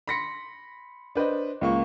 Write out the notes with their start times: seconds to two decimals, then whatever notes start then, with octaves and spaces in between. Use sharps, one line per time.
0.07 B5 C6 A#6 B6 C#7
1.15 D4 B4 C5 D#5
1.61 C#2 A#3 C#6